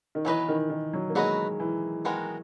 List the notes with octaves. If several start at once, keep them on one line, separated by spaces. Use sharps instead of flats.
D#3
E3 F#3 B3 F#4 B4 D#5
D#3
D#3
F#3
A#3
F#3 G#3 B3 F#4 B4 D#5
E3
D#3 G#3 B3 F#4 A#4